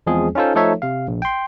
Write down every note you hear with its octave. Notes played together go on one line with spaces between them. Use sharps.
E2 F3 G#3 C4 G#4
C#4 D#4 F4 A4 C5
F3 A3 D#4 A4 C#5 E5
C3 F5
A#1
G5 C6